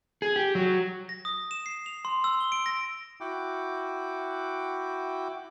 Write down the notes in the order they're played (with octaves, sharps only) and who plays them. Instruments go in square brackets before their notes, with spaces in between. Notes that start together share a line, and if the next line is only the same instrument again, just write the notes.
[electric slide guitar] G#4
G4
F#3
[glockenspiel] A#6
D#6
E7
C7
F7
C6
E6
G7
D7
A#6
[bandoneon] E4 F#4 F#5 G5 D6